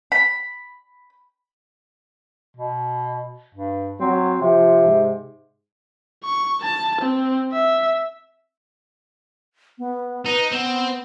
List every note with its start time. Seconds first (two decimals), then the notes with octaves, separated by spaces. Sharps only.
0.12 B5
2.57 B2
3.54 G2
4.00 F#3 C4
4.41 C3 F3
4.85 G#2
6.24 C#6
6.62 A5
7.01 C4
7.53 E5
9.78 B3
10.26 D#4 B4
10.52 B3 C4